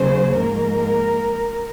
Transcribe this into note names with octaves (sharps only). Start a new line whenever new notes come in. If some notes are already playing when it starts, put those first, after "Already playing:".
Already playing: D#2 C#3 F#3 C5
G#2 F3 A#3 A#4